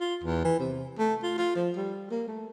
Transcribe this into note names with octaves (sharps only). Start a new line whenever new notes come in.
F4
E2
E3
C3
A3
F4
F4
F3
G3
A#3
A3